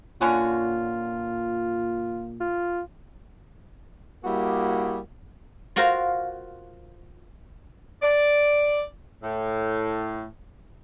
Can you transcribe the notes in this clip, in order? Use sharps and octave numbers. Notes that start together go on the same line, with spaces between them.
A#2 D3 C#4 F4 F#4
F4
G3 A#3 E4 F#4 G#4
F4 F#4 A#4 C5 F5
D5
A2